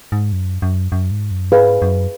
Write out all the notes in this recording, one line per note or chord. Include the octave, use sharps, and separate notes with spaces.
G#2
F#2
F#2
F#2
G#2
F#2
G#2 G#4 B4 F5
F#2